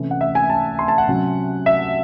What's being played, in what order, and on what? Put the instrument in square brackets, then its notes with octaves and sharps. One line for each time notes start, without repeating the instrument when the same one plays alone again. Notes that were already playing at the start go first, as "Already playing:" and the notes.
Already playing: [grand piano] C3 E3 A3 C#4 E4
F#5
E5
G#5
A5
C6
A5
F#5
C3 F#3 C#4
E5